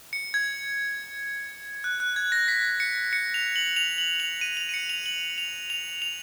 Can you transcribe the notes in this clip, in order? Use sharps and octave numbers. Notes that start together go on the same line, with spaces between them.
C#7
G#6
F#6
F#6
G#6
A#6
B6
C#7
C#7
F7
F#7
F7
F#7
F7
D#7
F7
D#7
C#7
F7
F#7
F7
F7
F7